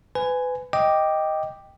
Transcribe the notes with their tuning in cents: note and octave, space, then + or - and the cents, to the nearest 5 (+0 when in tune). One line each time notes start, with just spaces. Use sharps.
B4 +30 G#5 +0
D#5 +5 G5 +0 D6 +0